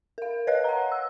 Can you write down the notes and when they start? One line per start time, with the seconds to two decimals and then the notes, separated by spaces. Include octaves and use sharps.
0.18 A#4 F5
0.47 B4 C#5 D#5 F5 F#6
0.64 F#5 A#5
0.92 E6